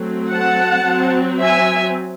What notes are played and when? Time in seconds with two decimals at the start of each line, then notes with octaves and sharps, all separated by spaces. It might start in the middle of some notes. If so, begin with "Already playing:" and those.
Already playing: F#3 A3 C4
0.31 F#5 A5
0.87 F#3 C4
1.41 E5 G#5